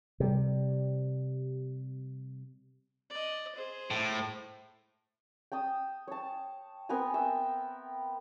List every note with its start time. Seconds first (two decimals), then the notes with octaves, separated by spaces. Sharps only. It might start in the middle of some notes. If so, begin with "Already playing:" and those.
0.20 C3 G3
3.10 D5 D#5
3.56 G#4 C5
3.91 A2
5.52 G5 A5 D#6
6.08 C#5 A5
6.89 B3 C4 A#4 G#5
7.14 E5 G5